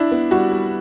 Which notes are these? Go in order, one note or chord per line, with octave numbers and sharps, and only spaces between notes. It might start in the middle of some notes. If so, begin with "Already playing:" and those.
Already playing: D4 E4
B3
G3 F#4
G3